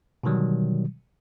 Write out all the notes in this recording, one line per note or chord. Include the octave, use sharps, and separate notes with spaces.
B2 D3 D#3 F#3 G3